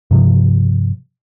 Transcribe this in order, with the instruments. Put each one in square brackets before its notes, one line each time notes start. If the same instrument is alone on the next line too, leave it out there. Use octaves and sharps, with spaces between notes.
[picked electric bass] G2 C3 F3